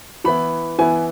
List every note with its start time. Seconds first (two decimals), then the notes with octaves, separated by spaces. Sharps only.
0.24 E3 B3 E4 B5
0.78 E3 B3 E4 G#5